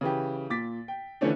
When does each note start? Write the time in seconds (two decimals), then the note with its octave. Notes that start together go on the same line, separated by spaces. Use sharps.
0.01 C#3 E3 G4
0.50 A#2 D6 A6 B6
0.88 G5
1.21 D3 E3 F3 A3 C#4 D4